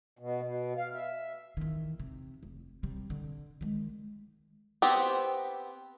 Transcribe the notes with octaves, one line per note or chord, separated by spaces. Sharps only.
B2
B2
F5
E5
E2 D#3
C3
F1
C3 G3
D3
D#3 G#3
B3 C4 G4